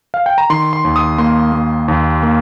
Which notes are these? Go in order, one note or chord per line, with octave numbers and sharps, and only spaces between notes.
F5
G5
A#5
D#3 C6
C6
D#2
D#6
A#3 C6
A#3
D#2
A#3